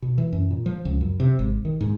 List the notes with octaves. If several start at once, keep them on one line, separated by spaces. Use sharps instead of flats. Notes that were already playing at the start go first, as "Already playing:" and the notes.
B2
E3
F#2
A#2
F3
C#2
F#2
C3
G#1
D#3
G#2